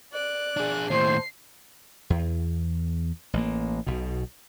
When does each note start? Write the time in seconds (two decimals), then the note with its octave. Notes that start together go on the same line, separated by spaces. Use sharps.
0.13 D5 F#6
0.57 D4 G#4
0.90 D#2 A2 C5 C7
2.10 E2
3.33 A1 A#3
3.87 B1 B2